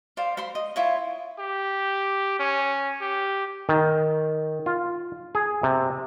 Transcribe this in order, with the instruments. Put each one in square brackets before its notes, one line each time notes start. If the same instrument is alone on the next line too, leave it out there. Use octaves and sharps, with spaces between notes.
[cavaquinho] C5 D5 F5
C5 B5 C6
D#5
E4 F4 C#5
[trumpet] G4
C#4
G4
[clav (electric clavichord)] D#3
F4
G#4
C3